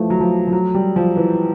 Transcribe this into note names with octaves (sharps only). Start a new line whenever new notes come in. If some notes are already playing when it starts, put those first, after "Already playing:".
Already playing: E3 F3 A3
F#3
F3
F3
F#3
G3
F3
E3